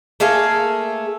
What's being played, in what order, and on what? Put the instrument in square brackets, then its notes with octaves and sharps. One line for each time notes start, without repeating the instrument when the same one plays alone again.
[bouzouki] A3 A#3 G#4 F5